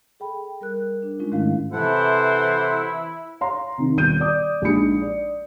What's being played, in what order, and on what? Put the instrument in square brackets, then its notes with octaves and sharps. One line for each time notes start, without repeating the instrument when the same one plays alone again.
[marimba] G#4 A4 G5 B5
G3 A#4 F#6
D4
G#3 C#4 D#4 F4
G#2 D#3 G#3 A3 E4 F5
[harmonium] C3 A4 F#5 [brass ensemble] E3 [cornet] E4 [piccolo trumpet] C5
[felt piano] C#5 F5 A#5 C6
C3 D#3
D#1 B2 G6 D#7
D5 D6 D#6
A#1 G#3 D4 D#4 B5 C#7
D5